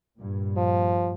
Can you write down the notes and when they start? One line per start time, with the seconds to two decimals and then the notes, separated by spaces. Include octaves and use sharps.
0.18 G2 A#2
0.57 F3